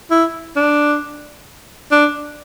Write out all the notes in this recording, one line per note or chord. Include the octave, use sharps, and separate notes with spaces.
E4
D4
D4